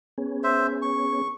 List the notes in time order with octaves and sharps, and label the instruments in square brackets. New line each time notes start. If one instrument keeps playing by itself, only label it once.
[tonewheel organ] B3 C#4 G#4
[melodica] C5 E5
C#6